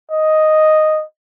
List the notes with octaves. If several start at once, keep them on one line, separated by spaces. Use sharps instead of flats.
D#5